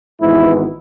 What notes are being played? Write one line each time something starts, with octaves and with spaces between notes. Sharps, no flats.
G#1 G#2 E3 B3 E4